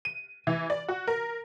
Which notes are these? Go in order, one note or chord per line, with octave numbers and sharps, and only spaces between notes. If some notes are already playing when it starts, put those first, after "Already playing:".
D#7
E3
D5
F#4
A#4